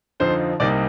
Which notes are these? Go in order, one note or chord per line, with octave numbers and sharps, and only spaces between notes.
F2 D3 F3 C4 D#4 C5
C2 C3 G3 A#3 D#4 D5